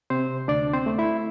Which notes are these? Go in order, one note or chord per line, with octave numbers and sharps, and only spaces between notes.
C3 C4 C5
D2 D4 D5
C4 C5
A3
E4 E5